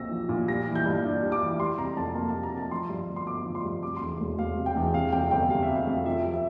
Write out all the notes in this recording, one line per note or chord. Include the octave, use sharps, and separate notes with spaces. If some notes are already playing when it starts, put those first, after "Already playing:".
Already playing: C2 A#2 F3 C4 E6 A#6
F3
A#2
G3 A#6
E3
G6
G2
D4
G3
D6
E3
G3 C6
C3 A#5
F2 A5
A#3 A5
G3 A5
A#5
C3 A5
F3 C6
G2
G1
C6
G1 D6
F3
C6
G2
C3 D6
E2 C6
E1
E1 F5
C3
G5
E2
C3 F5
F2 G5
G1 G5
G3 F5
E5
C3
F5
F2
F3 E5
C3
E5